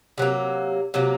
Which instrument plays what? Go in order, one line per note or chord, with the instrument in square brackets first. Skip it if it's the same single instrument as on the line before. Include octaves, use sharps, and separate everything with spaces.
[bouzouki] C3 F#3 A#3 C#4
C3 F#3 A#3